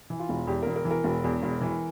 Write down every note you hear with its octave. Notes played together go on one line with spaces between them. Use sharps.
E3
F4
E1
E2 G4
E1 A#4
A#4
E3
A#4
E1
E2
E1
E3